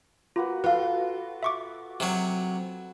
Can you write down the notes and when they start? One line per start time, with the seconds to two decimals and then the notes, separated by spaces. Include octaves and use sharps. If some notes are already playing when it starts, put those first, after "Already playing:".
0.36 A#3 F4 F#4 B4
0.64 F4 F#4 A4 B4 F5
1.43 E5 C#6 D6
2.00 C3 F#3